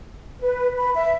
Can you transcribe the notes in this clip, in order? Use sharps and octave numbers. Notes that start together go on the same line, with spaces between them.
B4
B5
E5